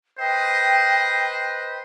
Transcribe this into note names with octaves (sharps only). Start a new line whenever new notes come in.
B4 C5 D#5 G5